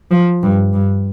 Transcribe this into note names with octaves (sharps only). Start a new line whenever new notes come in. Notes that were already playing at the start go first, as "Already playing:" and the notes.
F3
G2
G2